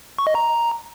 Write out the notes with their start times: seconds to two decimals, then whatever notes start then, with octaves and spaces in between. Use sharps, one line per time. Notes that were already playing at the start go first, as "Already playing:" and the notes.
0.18 C#6
0.27 D#5
0.35 A#5